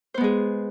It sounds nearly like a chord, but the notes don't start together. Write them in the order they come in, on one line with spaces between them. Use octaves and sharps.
C5 B3 G#3 G#4